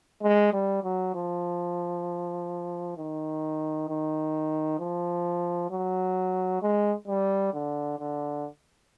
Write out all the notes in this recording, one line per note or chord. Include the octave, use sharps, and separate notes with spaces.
G#3
G3
F#3
F3
D#3
D#3
F3
F#3
G#3
G3
D3
D3